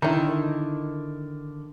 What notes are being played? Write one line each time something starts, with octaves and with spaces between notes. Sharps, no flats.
D3 D#3 E4